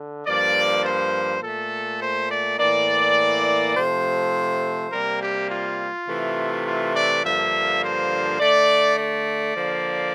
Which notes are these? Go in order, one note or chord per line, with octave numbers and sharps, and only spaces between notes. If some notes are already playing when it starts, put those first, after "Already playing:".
Already playing: D3
G2 F3 A#3 D5
C5
A#2 A3 A4
C5
D5
A2 E3 A#3 D5
C3 F3 A3 C5
C3 G3 A#3 A#4
G4
F4
C3 E3 A3
F4
D5
G2 D3 F3 A#3 E5
C5
D3 A3 D5
D5
D3 F3 A#3